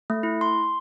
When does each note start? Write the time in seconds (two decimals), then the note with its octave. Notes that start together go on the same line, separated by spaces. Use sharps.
0.10 A3
0.23 E4
0.41 C6